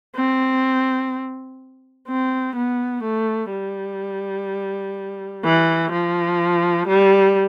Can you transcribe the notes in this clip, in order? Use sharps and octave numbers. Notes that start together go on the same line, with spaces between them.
C4
C4
B3
A3
G3
E3
F3
G3